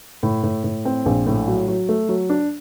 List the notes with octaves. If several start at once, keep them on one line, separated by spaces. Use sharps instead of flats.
A2
A2
A2
C4
A#1
A2
F#3
F#3
A3
F#3
D4